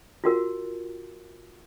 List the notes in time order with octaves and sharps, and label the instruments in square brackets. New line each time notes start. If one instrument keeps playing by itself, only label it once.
[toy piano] F4 F#4 A#4